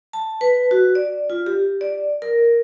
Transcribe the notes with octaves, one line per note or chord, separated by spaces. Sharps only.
A5
B4
F#4
D5
F4
G4
D5
A#4